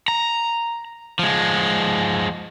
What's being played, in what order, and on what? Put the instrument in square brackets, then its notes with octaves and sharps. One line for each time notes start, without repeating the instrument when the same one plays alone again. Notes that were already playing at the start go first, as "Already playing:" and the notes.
[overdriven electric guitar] A#5
F3 G#3